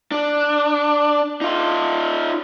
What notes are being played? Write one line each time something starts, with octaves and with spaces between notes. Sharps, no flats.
D4
D#4 F4